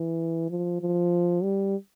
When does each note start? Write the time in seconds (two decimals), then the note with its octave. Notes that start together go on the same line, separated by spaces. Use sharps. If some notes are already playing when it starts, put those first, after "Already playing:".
Already playing: E3
0.50 F3
0.81 F3
1.43 G3